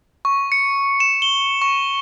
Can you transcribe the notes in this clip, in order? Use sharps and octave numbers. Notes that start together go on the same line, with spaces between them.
C#6
C#7
E7
G7
C#6